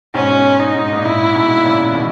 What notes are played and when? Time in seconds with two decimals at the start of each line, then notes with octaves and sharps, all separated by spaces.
0.14 G#2 B2 C#4
0.60 D#4
0.75 G#2
0.93 A#2
1.05 G#2 E4
1.35 G#2 B2
1.65 A#2 C#3
1.90 E3
1.95 B2 D#3